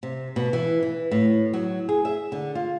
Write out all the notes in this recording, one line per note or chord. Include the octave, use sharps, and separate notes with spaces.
C3
B2
E3
E3
A2
F#3
G#4
E5
D3
F4